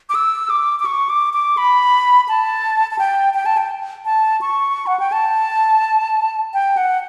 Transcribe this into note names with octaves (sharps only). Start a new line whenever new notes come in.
D6
E6
D6
D6
C#6
D6
D6
B5
A5
A5
G5
G5
A5
G5
A5
C#6
F#5
G5
A5
G5
F#5